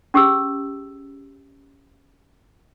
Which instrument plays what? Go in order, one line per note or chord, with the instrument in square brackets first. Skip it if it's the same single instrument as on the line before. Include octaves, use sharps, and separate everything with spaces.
[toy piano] C#4 G4 G#4 E6